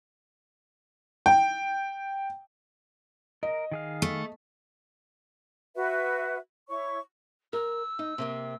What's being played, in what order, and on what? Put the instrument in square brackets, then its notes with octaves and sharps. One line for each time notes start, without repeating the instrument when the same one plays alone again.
[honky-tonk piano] G5
[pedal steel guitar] A#4 [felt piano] D#5
[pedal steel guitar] D#3 G#4 F5
[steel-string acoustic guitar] A3
[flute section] F#4 B4 E5
E4 C#5 C#6
[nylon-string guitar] A#4 [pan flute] E6
[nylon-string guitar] D#4
C3 A#3 C4